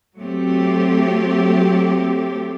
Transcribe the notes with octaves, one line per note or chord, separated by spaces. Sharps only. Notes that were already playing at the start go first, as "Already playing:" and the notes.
F#3 A3 C4 G4